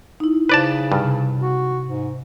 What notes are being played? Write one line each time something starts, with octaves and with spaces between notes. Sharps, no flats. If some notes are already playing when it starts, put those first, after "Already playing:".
D#4 E4
C#3 B4 C5 D5 A5
G2 C3 F6
F#4
G#2